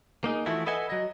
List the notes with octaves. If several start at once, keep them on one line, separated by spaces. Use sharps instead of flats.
A#3 D#4 G#4
E3 F3 A3 B3 E4 F#4
A4 B4 D#5 E5 F#5 G#5
F#3 D#5